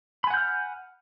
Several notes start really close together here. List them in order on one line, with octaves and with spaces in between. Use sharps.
B5 G#5 F#5 G6 F6